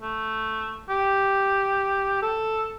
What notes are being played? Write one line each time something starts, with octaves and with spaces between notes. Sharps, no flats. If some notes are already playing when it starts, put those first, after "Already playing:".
A3
G4
A4